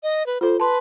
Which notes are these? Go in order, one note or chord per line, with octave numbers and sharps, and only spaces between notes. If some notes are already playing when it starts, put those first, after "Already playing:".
D#5
B4
F4 A4 C5
B4 A5 C6